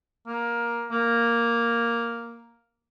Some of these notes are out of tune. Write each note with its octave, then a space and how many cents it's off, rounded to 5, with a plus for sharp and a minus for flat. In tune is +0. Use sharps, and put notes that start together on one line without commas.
A#3 +15
A#3 +0